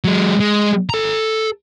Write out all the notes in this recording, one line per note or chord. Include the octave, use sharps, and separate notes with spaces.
F#3 G#3
G#3
A4 A#5